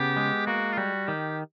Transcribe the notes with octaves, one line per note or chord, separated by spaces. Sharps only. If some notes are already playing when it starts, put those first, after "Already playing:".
Already playing: C#3 B3 G4
G#3
A#3 F#4
F4
G3 F#4
D#3 G4